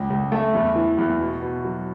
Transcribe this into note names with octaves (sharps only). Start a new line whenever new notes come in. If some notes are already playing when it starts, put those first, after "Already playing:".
Already playing: C#2
C#2
A3
E2
E3
E2
B2
B2
F#3